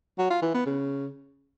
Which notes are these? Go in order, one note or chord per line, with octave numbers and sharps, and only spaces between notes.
F#3
F4
E3
B3
C#3